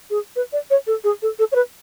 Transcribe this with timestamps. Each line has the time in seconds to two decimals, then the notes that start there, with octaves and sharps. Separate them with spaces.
0.10 G#4
0.36 B4
0.53 D5
0.70 C#5
0.87 A4
1.04 G#4
1.22 A4
1.39 A4
1.52 C#5
1.55 B4